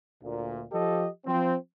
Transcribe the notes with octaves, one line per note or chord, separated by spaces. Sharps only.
D2 A#2
F3 G4 A4 D#5
F3 C4